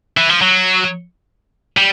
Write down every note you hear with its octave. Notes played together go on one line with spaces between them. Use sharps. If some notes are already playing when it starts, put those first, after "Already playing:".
E3
F3
F#3
G3